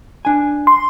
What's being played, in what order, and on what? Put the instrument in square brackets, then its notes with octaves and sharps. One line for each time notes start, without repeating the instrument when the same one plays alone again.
[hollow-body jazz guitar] D4 G#5
[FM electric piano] C6